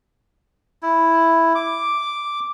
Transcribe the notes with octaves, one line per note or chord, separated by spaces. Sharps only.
E4
D6